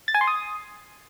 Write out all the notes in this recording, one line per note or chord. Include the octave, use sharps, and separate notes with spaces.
A6
G#5
C6
D#6